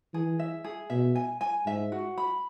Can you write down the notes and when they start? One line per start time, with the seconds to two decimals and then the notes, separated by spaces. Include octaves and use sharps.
0.14 E3 G#4
0.39 E5
0.64 G#4
0.90 B2 E5
1.16 G#5
1.41 G#5
1.66 G#2 E5
1.92 F#4
2.18 B5